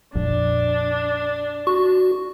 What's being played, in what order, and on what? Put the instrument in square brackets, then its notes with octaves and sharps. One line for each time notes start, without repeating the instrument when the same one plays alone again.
[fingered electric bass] A#1 F2 [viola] D4
[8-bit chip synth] F#4 [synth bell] C#6